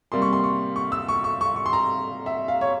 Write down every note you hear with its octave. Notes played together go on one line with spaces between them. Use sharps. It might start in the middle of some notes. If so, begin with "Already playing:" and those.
C3 G3 A#3 C6
C#6
C6
C#6
C#6
E6
C#6
C#6
C#6
C#6
C6
A#5
E5
F5
C#5